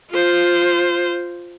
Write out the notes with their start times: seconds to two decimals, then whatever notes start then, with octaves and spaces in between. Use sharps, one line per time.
0.10 F4 C5